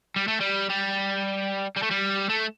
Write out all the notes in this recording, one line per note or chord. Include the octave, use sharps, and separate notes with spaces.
G3
A3
G3
G3
G3
A3
G3
A3